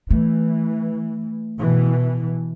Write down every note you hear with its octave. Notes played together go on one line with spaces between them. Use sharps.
E3 A3
B2 E3